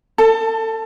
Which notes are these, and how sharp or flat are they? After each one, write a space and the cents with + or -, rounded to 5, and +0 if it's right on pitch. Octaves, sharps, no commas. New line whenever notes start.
A4 +30 A5 +0